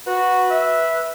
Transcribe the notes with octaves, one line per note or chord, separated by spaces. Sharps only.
F#4 B4
E5